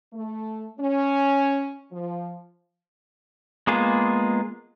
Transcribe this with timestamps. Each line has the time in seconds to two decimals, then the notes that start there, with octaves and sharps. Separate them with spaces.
0.12 A3
0.79 C#4
1.92 F3
3.67 G#3 A#3 B3 F4 G#4